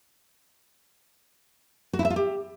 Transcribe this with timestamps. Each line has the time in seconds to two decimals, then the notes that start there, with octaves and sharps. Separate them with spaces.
1.93 F#4
1.99 E4
2.05 E5
2.10 F4
2.16 G4